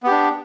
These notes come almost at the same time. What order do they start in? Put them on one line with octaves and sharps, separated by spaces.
B3 G4 D4